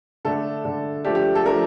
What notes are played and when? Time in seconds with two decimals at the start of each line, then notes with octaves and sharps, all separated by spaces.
0.25 D3 A3 D4 A4
0.65 D3 A3 D4
1.05 F3 A3 D4 G4
1.15 G4
1.35 A4
1.45 F3 A3 D4 A#4